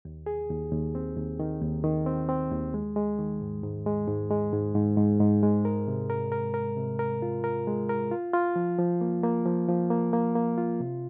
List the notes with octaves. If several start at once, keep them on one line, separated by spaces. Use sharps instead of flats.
D#2
G#4
D#2
D#2
C4
D#2
D#3
D#2
D#3
C4
C4
D#2
G#3
G#3
D#3
G#2
G#2
G#3
G#2
G#3
G#2
G#2
G#2
G#2
G#3
A#4
C3
A#4
A#4
A#4
C3
A#4
F4
A#4
G#3
A#4
F4
F4
F3
F3
A#3
A#3
F3
F3
A#3
A#3
A#3
F4
C3